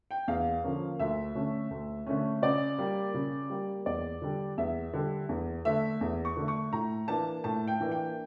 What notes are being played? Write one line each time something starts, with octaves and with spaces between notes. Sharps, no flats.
G5
E2 F5
D3 F3 A#3 C#4
D2 E5
D3 A3 C#4
D2
D3 A3 C#4
C#3 D5
G3 A#3
C#3
G3 A#3
E2 D5
D3 G3
E2 E5
D3 G3
E2
D3 A3 E5
E2
C#6
D3 A3
C#6
A2 A#5
E3 A#3 D4 A5
A2 A5
G5
E3 A#3 D4
G5